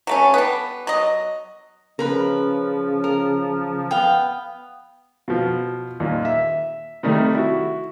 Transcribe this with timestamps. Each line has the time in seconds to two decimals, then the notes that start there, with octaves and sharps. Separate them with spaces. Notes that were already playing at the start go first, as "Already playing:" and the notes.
0.07 F#3 A3 C#4
0.34 G3 B3
0.87 F#3 D#5
1.99 C#3 F3 A#4 B4 B5
3.04 A#4
3.91 B3 F5 G5
5.28 B2 F3
6.00 D#2 A#2
6.25 E5
7.03 C3 D#3 G3 A3
7.35 E4 F#4